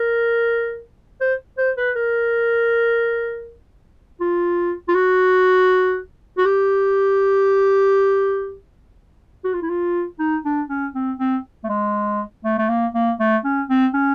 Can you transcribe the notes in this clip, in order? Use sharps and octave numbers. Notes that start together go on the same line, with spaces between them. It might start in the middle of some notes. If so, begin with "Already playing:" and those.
Already playing: A#4
C5
C5
B4
A#4
F4
F4
F#4
F#4
G4
F#4
F4
E4
F4
D#4
D4
C#4
C4
C4
A3
G#3
A3
A3
A#3
A#3
A3
C#4
C4
C#4